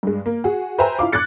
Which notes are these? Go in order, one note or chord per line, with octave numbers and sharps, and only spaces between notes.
G2 G#3
A#3
F#4 G#4
B4 C5 E5 G5 G#5 A#5
E4 F4 F5 D6
D6 F#6 G#6 A6 C#7